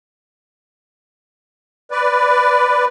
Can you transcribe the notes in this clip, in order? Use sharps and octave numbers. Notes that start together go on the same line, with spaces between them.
B4 D5